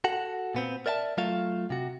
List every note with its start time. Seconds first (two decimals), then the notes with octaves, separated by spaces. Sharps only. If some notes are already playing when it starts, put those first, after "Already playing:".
0.04 F#4 A4 F#5
0.55 A#2 B3 C4
0.86 A#4 D5 E5 F#5 A5
1.18 F#3 A3 F4 A4 E5 F5
1.70 C3 F#4